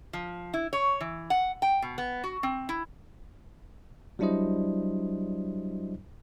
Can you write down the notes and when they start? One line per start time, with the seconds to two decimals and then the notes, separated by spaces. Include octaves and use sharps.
0.13 F3
0.54 E4
0.73 C#5
1.01 E3
1.30 F#5
1.62 G5
1.82 B2
1.98 B3
2.24 F#4
2.43 C4
2.69 E4
4.19 F#3 G3 D4 E4 C5 D#5